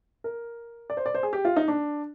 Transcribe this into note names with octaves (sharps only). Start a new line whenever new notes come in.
A#4
D5
C5
D5
C5
G#4
G4
F4
D#4
D4